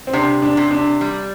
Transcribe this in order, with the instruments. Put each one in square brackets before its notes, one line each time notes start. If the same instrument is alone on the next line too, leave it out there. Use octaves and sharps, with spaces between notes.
[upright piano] C4
[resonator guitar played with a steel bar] C3 [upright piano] D4
[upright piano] D4
[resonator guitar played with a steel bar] C3
[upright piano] D4
[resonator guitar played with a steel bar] G3